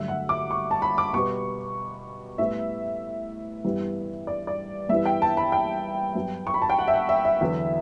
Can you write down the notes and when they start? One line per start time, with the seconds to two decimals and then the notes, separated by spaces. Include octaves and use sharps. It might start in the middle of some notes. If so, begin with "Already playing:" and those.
Already playing: G2 D3 F#3 A3 E5
0.08 F#5
0.29 D6
0.51 C#6
0.71 A5
0.82 B5
0.98 D6
1.13 B2 G3 B3 C#6
2.38 A2 G3 B3 E5
3.64 G2 E3 G3 B3
4.27 D5
4.47 D5
4.89 G2 E3 G3 B3 E5
5.05 G5
5.22 A5
5.37 B5
5.52 G5
6.15 G2 F#3 B3
6.47 C#6
6.54 B5
6.62 A5
6.70 G5
6.79 F#5
6.88 E5
6.94 F#5
7.09 E5
7.25 E5
7.41 E2 D3 F#3 B3